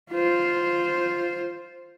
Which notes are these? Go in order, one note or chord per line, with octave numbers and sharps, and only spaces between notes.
F4 C5